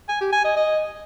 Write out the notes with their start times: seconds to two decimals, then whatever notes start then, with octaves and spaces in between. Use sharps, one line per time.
0.09 G#5
0.21 G4
0.32 G#5
0.44 D#5
0.56 D#5